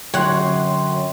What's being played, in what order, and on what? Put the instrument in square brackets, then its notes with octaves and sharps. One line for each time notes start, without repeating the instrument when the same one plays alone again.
[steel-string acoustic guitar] F#2 [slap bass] D3 F#3 [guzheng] C#5 F#5 [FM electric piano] G5 C6